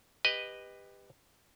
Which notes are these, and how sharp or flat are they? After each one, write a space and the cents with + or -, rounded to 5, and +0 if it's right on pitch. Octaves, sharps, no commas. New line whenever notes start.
G4 +20 B4 +5 D#5 -5